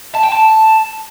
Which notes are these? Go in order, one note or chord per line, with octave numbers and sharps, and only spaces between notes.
A5
G5
A5